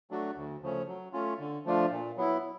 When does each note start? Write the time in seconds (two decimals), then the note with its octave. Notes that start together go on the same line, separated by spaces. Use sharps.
0.11 F#3 A3 D4 F#4
0.36 D2
0.63 C#3 F3 A3 C#4
0.88 F#3
1.13 A3 C#4 F4
1.39 D3
1.65 F3 A3 D4 F4
1.91 A#2
2.17 F#3 B3 E4